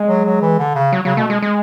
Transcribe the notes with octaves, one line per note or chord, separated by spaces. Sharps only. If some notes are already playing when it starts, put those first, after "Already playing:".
Already playing: G#3
F#3
F#3
E3
D3
C#3
F#3
C#3 F#3
B2 A3
G#3
G#3